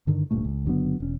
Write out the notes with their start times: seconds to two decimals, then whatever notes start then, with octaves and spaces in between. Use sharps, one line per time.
0.07 G2 D3 D#3
0.31 D1 G2 A#2 A3
0.45 C#2
0.65 F#1 D3 F#3 B3
1.00 E1 C#4